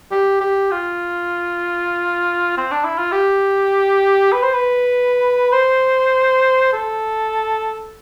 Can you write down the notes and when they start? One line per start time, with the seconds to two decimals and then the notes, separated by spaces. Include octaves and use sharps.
0.11 G4
0.41 G4
0.71 F4
2.57 C4
2.71 D4
2.85 E4
2.98 F4
3.12 G4
4.32 B4
4.43 C5
4.53 B4
5.53 C5
6.73 A4